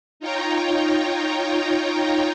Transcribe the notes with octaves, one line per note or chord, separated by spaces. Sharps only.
D#4 F4 C#5 G5 A#5